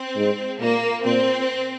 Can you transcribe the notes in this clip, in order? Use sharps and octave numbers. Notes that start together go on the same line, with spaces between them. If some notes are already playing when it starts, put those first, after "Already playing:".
Already playing: C4
G#2
A#2 A#3
A#2 C4